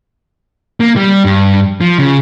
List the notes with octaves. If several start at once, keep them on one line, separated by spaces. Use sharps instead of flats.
A#3
G3
G2
F3
C#3